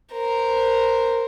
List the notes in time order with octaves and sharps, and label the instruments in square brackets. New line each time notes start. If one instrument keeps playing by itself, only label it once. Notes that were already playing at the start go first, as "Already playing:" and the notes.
[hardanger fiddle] A#4 C5